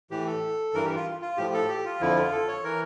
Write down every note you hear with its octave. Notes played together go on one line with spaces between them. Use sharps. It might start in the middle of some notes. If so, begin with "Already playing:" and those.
A2 E3 G4
A4
G2 E3 A#4
G4
F4
F4
A2 F3 G4
A4
G4
F4
F2 D3 F3 E4
F4
A4
C#5
E3 A#4